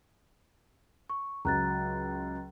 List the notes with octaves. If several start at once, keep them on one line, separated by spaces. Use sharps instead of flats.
C#6
C#2 F#3 A#5 F#6 A6